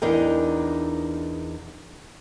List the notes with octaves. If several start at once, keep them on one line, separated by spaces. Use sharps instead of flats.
E2 D4 D#4 A#4 D#5 G5